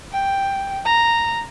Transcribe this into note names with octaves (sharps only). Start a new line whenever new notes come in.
G5
A#5